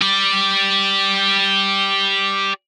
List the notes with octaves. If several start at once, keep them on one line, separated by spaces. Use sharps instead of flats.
G4 D5